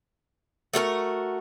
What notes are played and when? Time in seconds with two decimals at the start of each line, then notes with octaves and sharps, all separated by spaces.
0.73 A3 F#4 G#4 A#4